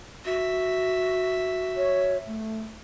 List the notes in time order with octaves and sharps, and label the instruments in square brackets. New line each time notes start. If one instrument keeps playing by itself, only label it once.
[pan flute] F#4 [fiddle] E5
[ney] C#5
A3